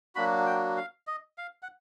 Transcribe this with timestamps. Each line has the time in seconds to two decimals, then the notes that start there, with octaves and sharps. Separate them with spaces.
0.15 F#3 A#3 D4 F#4 B5
0.46 G5
0.77 F5
1.07 D#5
1.38 F5
1.62 F#5